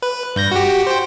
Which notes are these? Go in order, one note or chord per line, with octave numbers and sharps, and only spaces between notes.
B4
G2 G6 A#6
F#4 G4
C5 G5